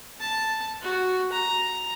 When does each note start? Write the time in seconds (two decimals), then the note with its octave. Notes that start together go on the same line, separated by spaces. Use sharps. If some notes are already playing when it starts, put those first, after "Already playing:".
0.20 A5
0.81 F#4
1.32 A#5